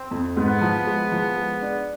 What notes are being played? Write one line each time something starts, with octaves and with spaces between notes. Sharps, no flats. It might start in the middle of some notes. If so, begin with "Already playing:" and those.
Already playing: C4
F2
G#2 B3
F3
G#3
F3
G#3
D4